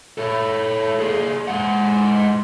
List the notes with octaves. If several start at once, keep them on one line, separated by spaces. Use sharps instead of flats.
A4 C#5
A#3 G#4
G#3 F#5